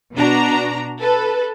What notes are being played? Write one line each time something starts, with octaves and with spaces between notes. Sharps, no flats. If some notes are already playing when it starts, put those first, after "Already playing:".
B2 D4 F#4 A#5
A4 B4